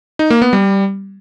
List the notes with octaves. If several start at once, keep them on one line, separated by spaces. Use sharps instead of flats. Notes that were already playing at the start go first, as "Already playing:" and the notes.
D#4
A#3
B3
G3